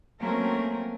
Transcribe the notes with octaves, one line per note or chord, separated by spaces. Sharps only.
F#3 A3 A#3 C4 C#4 A#4